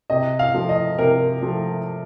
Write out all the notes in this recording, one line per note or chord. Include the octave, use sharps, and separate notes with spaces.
C3 D#5
F5
F3 A3
D#5
C3 A#4
F3 A3